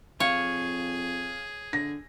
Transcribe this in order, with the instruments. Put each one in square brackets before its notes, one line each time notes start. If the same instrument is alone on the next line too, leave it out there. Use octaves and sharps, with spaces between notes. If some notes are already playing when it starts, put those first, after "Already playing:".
[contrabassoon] F2 [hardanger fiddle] G#4 [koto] C#5 [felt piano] F5
[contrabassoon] D3 [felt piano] A#6